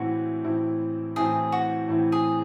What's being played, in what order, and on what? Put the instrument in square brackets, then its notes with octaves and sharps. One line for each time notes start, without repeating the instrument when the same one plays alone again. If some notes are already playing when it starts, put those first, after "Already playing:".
Already playing: [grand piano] A2 E3 C4 E4 [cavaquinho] F#4
[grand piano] A2 E3 C4 E4
[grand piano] A2 E3 C4 E4 [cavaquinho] G#4
[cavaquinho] F#4
[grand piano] A2 E3 C4 E4
[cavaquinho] G#4